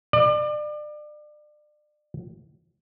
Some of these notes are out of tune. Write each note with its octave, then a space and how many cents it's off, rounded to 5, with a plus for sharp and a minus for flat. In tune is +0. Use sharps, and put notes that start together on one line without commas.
D5 +35